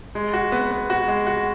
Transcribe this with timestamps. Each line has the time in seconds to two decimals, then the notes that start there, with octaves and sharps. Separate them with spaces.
0.15 G#3
0.34 F#4
0.52 B3
0.71 B3
0.90 F#4
1.08 G#3
1.27 F#4